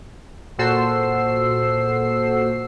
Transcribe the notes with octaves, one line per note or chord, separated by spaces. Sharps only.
A#2 F#4 A4 C5 E6 C7